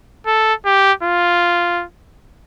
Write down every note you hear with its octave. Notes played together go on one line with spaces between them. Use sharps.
A4
G4
F4